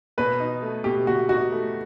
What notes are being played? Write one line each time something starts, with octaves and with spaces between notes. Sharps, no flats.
B2 B4
D#4
A3
B2 G4
B2 F#4
D#4 F#4
A3